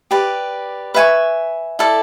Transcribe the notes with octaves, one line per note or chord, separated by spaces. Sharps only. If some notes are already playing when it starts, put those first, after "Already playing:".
G4 B4 D5
B4 E5 G#5 C#6
E4 A4 D5